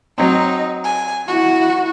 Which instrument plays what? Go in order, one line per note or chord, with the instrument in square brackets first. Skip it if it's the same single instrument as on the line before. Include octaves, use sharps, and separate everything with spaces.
[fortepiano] F#3 C4 [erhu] D#4
[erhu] G#5
[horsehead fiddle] E4 F#5 [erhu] F#4